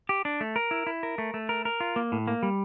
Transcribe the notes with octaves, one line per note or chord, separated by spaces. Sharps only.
G4
D4
A3
A#4
E4
E4
A#4
A3
A3
A#4
A#4
F4
A#3
A2
A#3
G3